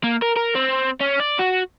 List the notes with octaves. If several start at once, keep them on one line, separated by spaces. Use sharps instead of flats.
A#3
A#4
A#4
C4
C#4
D5
F#4